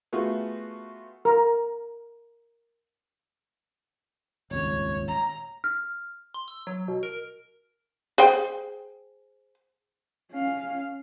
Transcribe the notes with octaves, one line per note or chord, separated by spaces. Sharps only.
A3 B3 F4 F#4 G#4
A#4
D#1 G#1 C#2 C#5
A#5
F6
C6
E6
F#3
B2
A#4
G#4 C5 G5
C#4 F5